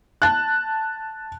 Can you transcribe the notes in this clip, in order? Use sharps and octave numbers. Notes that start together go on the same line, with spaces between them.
A5 F#6